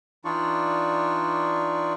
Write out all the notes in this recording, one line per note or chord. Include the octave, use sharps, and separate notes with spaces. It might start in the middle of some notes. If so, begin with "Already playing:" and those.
E3 D4 D#4 F4 D5 C#6